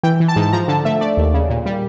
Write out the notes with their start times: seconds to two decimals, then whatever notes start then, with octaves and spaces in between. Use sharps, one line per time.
0.03 E3 G5
0.20 E3
0.28 A5
0.36 G#2
0.42 A5
0.53 F3 A#5
0.68 D3 A5
0.85 A3 E5
1.01 A3 D5
1.17 D#2
1.34 C#3
1.50 A#2
1.66 G3